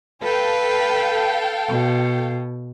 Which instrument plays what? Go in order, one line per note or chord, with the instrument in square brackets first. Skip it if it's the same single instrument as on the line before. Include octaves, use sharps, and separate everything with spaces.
[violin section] A4 F5 G5 [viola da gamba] B4
[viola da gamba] B2